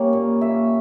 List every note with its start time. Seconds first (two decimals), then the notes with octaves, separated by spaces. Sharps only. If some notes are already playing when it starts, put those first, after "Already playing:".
Already playing: G3 A#3 C#4 C#5
0.13 A#2
0.41 A#3 E5